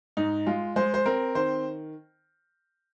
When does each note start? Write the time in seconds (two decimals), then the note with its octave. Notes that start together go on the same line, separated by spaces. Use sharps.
0.17 G#2 D#4
0.46 G#3 F4
0.76 G#3 C5
0.94 C5
1.06 C4 A#4
1.35 D#3 C5